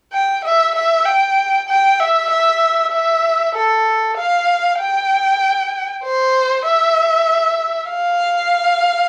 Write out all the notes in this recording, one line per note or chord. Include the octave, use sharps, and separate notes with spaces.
G5
E5
E5
G5
G5
E5
E5
E5
A4
F5
G5
C5
E5
F5